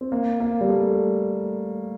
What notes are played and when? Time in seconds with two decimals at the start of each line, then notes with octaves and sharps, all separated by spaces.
0.01 C4
0.12 A#3
0.40 A#3
0.61 G3
0.68 A3